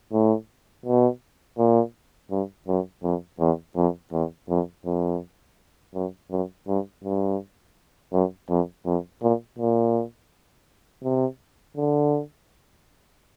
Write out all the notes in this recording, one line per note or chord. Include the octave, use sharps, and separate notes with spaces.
A2
B2
A#2
G2
F#2
F2
E2
F2
E2
F2
F2
F#2
F#2
G2
G2
F#2
F2
F2
A#2
A#2
C3
D3